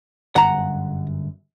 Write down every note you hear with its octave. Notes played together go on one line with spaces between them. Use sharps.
G1 F#2 F#5 A#5